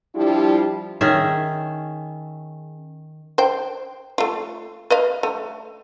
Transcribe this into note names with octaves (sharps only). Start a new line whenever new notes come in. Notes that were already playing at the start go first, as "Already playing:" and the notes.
F3 G3 D4 E4 F4 G4
D#3 C#4 G#4 E5
C5 G5
A3 F4
B4 D#5 F5
A3